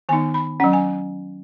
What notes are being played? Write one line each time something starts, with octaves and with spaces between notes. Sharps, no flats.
D#3 B3 D#4 G#5
B5
F#3 C#4 F#5
G#5